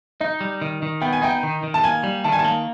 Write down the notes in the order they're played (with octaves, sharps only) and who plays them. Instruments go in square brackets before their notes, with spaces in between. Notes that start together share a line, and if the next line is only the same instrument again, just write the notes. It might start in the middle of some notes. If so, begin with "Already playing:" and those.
[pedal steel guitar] D#4 [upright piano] D#5
[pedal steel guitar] G3
D#3
D#3
[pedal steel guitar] B3 [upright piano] G5
[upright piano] G#5
[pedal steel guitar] D#4 [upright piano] G5
[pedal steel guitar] D#3
D#3
[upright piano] A5
[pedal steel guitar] A#3 [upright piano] G#5
[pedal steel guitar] G3
[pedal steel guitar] D#3 [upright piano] A5
[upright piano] G#5
A5
[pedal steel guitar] A#3